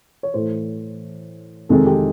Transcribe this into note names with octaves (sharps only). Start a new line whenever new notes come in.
C#5
A2 E3 A3 C5
F2 C3 D#3 G#3 A4
G4